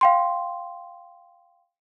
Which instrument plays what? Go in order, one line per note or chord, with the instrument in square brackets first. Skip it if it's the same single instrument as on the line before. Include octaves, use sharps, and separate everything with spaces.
[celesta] F5 G5 C6